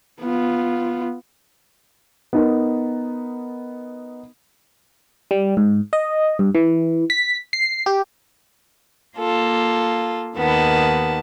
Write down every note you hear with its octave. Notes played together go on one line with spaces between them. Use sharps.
B3 F4
B3 D#4 A#4
G3
G#2
D#5
G2
E3
B6
C7
G4
A#3 F4 A4
D#2 D#3 B3 A5